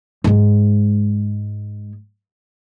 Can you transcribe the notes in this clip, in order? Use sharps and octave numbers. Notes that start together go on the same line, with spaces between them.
G#2 G#3